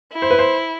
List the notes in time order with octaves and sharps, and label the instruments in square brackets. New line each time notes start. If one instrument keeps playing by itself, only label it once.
[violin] E4
[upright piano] C5
B4
C5